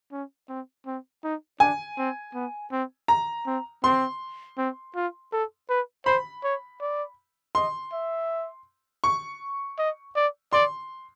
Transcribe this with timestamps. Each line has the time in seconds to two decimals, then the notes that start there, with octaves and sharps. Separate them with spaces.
0.12 C#4
0.49 C4
0.86 C4
1.24 D#4
1.60 D4 G#5
1.98 C4
2.34 B3
2.72 C4
3.08 A#5
3.46 C4
3.84 C4 C6
4.58 C4
4.95 F4
5.32 A4
5.69 B4
6.06 C5 B5
6.44 C#5
6.81 D5
7.55 D#5 C6
7.93 E5
9.04 C#6
9.78 D#5
10.16 D5
10.53 D5 C6